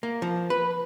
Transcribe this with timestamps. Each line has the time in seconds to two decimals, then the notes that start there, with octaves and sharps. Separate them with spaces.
0.03 A#3
0.22 F3
0.50 B4